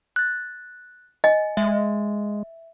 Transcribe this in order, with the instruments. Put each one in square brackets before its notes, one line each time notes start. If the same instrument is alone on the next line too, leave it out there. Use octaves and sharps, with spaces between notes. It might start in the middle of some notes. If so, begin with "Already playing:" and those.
[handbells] F#6 A6
[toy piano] D#5 [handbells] G#5
[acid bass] G#3 [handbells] E5